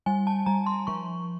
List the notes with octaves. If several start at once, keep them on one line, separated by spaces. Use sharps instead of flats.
G3 G#5
A5
G3 A#5
C6
F3 C#6